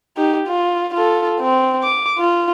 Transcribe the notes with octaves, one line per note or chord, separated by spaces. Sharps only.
D#4 G4
F4
F4 A4
C4
D6
F4